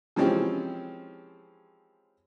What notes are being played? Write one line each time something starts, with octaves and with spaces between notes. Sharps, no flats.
E3 F3 G#3 C4 C#4 G4